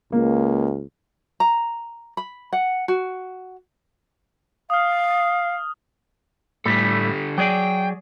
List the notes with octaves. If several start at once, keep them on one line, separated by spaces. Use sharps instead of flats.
C#2 A#3
A#5
B5
F#5
F#4
F5 D#6 F6
A2 D3 G3 A3 G4 A4
F#3 G#4 D5 G5